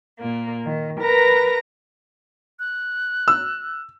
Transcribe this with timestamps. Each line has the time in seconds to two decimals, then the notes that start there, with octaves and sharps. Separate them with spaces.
0.18 A#2 A#3
0.64 D#3
0.99 A#4 B4 A#5 A#6
2.59 F#6
3.28 E6